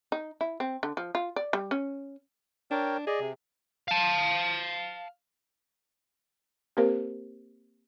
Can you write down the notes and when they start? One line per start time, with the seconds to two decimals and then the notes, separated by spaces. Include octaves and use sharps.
0.12 D#4
0.41 E4
0.60 C4
0.83 D3
0.97 F3
1.15 F4
1.36 D5
1.53 G3
1.71 C#4
2.71 D4 A#4 C#5 G5
3.07 G#4 D5 D#5
3.20 C3
3.88 F5 A5
6.77 A#3 C4 G4 A#4 C5 F5